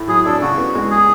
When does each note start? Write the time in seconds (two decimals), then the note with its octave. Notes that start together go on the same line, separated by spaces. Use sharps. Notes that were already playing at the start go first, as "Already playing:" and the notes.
Already playing: A2 A3
0.08 F#3 G#4
0.26 D4 A4
0.42 C#3 F#4
0.58 B3
0.75 G#3
0.91 G#4